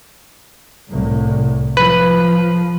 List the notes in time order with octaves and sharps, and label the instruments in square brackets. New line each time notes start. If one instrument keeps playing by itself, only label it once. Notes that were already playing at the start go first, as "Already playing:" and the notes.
[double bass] C2 A2
[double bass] F3 [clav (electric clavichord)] B4